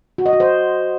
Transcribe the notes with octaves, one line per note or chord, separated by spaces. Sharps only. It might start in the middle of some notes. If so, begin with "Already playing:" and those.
F#4
D#5
F#4
C5